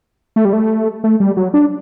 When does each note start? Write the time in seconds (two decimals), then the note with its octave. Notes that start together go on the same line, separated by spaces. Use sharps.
0.36 A3
0.45 G3
0.53 A3
1.04 A3
1.20 G3
1.37 F#3
1.54 D4